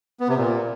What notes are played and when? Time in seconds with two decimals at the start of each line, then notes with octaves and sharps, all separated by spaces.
0.20 B3
0.29 C3
0.37 A#2